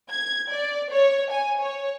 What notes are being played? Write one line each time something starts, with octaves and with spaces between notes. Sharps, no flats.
G#6
D5
C#5
G#5
C#5